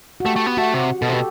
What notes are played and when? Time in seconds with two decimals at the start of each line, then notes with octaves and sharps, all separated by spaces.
0.20 F#4
0.25 A3 G4
0.36 A3
0.46 B3
0.57 A3 F#4
0.74 C3
1.02 B2 A4
1.09 C3
1.13 B2 G4